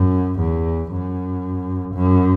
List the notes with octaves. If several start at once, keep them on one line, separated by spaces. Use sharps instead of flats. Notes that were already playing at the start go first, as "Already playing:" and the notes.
Already playing: F#2
E2
F#2
F#2